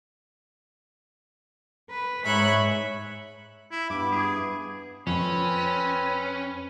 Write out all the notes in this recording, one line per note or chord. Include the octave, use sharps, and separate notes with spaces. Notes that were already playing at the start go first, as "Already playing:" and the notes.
B4
G#2 C#5 E5 B5 F#6
E4
G2 B3 E4 B4 D6
G#4
F2 C4 C#4 B4